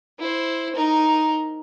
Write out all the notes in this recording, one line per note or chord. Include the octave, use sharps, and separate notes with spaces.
E4 C5
D#4 A#4